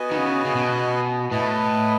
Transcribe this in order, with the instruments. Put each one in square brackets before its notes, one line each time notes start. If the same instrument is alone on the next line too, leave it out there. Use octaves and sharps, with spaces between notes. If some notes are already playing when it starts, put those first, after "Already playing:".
Already playing: [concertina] B3 F#4 B4 D#5 G#5
[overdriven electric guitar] D#3
C#3
C#3
B2
[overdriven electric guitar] A2 [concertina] E4 B4 D#5